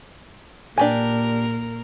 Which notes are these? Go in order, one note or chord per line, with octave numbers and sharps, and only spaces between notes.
A#2 D4 G4 A#4 G#5